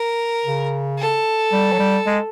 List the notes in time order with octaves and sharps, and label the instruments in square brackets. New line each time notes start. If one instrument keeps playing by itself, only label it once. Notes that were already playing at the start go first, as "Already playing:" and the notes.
Already playing: [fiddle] A#4
[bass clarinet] C#3
[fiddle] A4
[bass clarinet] G3
F#3
G3
G#3